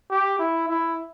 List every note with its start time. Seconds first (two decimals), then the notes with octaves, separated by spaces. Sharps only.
0.10 G4
0.39 E4
0.68 E4